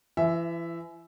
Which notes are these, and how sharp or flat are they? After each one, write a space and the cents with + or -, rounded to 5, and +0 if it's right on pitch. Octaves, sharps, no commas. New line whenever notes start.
E3 +35 E5 +0